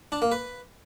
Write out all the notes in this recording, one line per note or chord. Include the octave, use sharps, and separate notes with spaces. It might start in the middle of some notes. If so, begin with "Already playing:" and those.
D4
A#3
B4